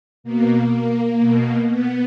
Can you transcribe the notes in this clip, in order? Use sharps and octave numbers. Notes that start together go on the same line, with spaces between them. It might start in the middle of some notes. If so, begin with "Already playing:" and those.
B2 A#3
B2
B3